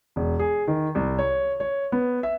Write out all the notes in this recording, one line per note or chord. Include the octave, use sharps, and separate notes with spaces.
E1
G#4
D#3
C2
C#5
C#5
B3
E5